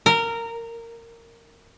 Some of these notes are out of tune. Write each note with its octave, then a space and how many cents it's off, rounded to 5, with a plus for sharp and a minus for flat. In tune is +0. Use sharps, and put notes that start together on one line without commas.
A#4 -15